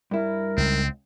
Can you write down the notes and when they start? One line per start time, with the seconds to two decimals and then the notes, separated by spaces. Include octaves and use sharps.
0.11 G2 E4 A#4
0.57 C#2 C4